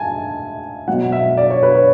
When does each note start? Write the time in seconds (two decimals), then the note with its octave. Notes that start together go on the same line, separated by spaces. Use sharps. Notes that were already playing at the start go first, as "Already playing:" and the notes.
Already playing: G#5 A5
0.88 B2 F#3 F#5
1.12 E5
1.38 D5
1.50 C#5
1.63 B4
1.75 C#5